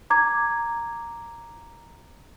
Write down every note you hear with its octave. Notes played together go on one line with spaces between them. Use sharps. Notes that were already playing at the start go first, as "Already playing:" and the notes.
A#5 D6 G#6